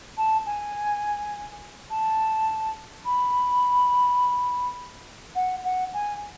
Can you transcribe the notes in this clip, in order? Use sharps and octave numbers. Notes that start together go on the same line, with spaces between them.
A5
G#5
A5
B5
F#5
F#5
G#5